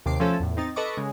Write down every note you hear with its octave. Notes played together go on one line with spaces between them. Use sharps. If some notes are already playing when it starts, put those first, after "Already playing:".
D#2 C3 D6 C7
F3 A3 C#4 A4
E2 A2
C4 D#4 A6
A4 B4 D#5 C#6 D6
C#3 G#3